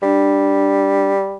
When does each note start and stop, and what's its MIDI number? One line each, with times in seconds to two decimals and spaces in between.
0.03 1.38 55
0.03 1.10 62